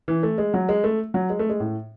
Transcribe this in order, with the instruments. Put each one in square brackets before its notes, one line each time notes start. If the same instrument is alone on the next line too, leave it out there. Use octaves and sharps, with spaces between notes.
[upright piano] E3
A3
G#3
F#3
G#3
A3
F#3
G#3
A3
G#3
A2